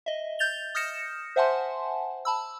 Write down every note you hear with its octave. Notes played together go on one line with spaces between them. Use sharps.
D#5 E5
G6 A6 F7 G7
D#6 F6 G6 A#6 C#7 E7
C5 E5 F#5 G#5 A5 C6
A5 B5 E6